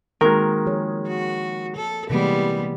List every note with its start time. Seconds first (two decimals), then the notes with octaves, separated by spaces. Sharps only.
0.21 D#3 G#3 A#3 C4 F#4 A#4
0.66 F3 G#4 C#5
1.07 F#4
1.76 A4
2.10 C3 E3 G3 G#3 A#3 B3